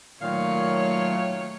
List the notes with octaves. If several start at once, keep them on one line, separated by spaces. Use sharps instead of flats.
A#2 D#3 F#3 A3 C#5 F5